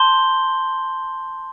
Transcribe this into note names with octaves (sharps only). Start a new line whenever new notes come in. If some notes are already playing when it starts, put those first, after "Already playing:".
Already playing: A5 C6 G6 G7